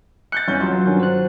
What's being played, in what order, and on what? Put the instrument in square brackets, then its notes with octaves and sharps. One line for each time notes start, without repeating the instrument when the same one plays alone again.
[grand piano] F#6 G6 A6 [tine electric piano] C#7
[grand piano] E2 C#4 G6
F#3 F4
[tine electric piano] G2 D#3 C#4
C5 F#6